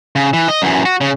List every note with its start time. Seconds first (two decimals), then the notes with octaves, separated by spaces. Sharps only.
0.16 C#3
0.33 E3
0.48 D#5
0.62 F#2 E3
0.85 F#4
1.01 C#3